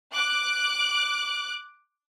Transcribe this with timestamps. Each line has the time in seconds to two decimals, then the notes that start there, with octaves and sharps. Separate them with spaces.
0.12 D6 F#6